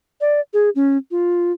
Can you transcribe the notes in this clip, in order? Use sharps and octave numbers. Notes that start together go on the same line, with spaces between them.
D5
G#4
C#4
F4